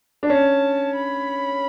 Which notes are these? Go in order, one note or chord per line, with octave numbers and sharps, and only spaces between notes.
D4
C#4 A5
B5